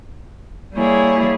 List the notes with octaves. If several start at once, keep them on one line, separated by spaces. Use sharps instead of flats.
G3 A#3 E4 G#4 C#5